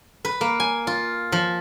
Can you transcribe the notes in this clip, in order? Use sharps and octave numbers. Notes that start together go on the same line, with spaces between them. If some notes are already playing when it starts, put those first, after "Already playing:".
B4
A#3
G#5
F4
F3